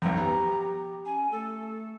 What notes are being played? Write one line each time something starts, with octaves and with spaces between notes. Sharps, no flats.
B1 F2 A#5
B3 G4
C#4 G#5
A3 A4